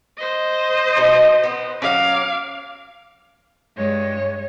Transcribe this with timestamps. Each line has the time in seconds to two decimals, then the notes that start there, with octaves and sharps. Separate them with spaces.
0.17 C5 D#5
0.97 B2 D#4
1.44 B3 C4
1.82 F#3 G#3 C#4 F5 D6
3.77 G2 G#3 C#5